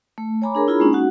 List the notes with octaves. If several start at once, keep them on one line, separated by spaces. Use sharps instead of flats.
A3
C#5 G#5 A#5 B5 D6
D4 G#4 A#4 C#5
D4 E4 F4 G#4 A#5 B5
G#3 A#3 C#4 D#4
F#4 F#5